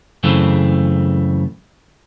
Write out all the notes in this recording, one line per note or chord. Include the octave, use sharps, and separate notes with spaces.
F#2 C#3 E3 A3 C4